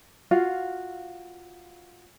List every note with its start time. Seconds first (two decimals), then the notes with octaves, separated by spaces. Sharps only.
0.31 F4 F#4 F5